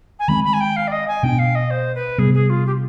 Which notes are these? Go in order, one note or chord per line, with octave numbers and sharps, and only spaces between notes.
G#5
D#3 G#3 C4 B5
B5
G#5
G5
F5
D5
D#5
G#5
B2 B3 D4 G5
F5
D#5
C5
B4
C3 G3 B3 G#4
G#4
F4
G4